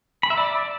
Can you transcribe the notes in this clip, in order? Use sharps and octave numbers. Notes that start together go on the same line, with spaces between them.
B5
E5
D5